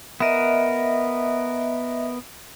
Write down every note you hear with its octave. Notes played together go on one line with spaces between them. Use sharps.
B3 A#4 D#5 E5